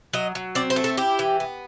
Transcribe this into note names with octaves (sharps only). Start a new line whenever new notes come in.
F#3 D#5
F#3
C4 D5
C5
A3
A4
E4 G4
E3
B3